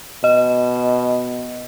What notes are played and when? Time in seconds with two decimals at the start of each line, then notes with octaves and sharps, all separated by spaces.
0.24 B2 D#5